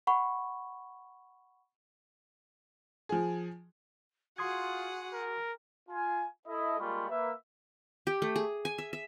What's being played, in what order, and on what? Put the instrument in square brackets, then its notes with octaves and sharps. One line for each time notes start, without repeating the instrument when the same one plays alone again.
[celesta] F#5 B5 C#6
[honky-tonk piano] F3 G#4
[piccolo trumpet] F4 [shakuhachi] F#4 [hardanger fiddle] G#4 F#5 [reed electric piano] C6 D#6 G#6
[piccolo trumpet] A#4
[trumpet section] F4 G#5
E4 A4 D#5
G3 G#3 A#3 F4 B5 C#6
A#3 B4 E5
[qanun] G4
A3
G#4
G#5
E5
E5